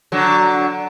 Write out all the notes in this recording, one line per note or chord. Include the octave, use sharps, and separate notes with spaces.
D3 F#3